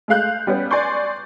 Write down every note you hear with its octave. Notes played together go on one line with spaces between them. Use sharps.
G#3 A3 F5 F#6 G6
G3 B3 C#4
D5 G#5 C6 C#6 G6